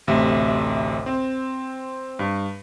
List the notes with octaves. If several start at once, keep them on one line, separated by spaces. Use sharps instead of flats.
A1 D2 C3 E5
C4
G2